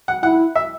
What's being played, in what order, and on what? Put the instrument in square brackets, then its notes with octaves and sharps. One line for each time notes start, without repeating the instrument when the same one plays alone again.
[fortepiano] F#5
[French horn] E4 [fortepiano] F#5
[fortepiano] E5